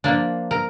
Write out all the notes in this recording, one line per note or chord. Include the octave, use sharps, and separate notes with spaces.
F3 A#3 D4
A#4